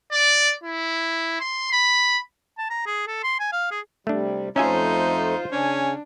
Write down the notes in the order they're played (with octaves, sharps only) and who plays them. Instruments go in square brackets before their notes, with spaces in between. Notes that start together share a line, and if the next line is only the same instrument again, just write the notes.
[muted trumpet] D5
E4
C6
B5
[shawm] A5
A#5
G#4
A4
C6
G#5
F5
G#4
[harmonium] C3 G3 [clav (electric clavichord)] A3 D4
[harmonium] F2 A3 [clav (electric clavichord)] C#4 E5 G#5 [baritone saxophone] D#4 [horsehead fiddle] F4 C5
[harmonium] C#3 G#5 [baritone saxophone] C#4 [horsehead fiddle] D4